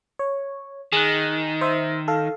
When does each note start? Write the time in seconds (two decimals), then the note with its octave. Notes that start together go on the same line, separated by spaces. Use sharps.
0.19 C#5
0.93 D#3 G#4 F#6
1.61 C5 E5
2.08 A4 F5